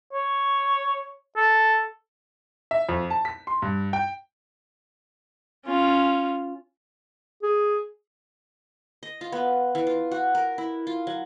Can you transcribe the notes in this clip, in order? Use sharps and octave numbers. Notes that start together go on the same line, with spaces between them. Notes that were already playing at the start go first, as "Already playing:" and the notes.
C#5
A4
E5
F2
A5
B6
C6
G2
G5
C#4 F4
G#4
D#5
F4
B3
E3
F4
F#4
A#4
E4
F4
F#3